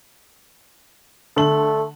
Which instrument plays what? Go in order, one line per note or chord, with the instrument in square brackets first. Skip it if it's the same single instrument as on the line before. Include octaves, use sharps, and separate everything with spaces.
[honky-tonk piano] D3 F#7 [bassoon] A3